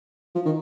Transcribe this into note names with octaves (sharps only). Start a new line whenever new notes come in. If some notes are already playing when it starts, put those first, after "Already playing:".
F3
D#3